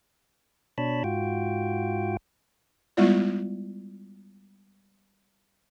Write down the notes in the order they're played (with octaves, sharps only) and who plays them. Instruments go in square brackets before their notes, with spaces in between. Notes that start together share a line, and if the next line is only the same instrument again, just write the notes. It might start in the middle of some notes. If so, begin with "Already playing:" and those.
[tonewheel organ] B2 D4 C#5 A5 B5
G#2 F4 F#4 G5
[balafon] G3 G#3 B3 E4 F4 D5